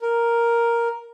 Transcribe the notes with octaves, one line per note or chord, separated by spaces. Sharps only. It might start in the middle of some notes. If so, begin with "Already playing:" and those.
A#4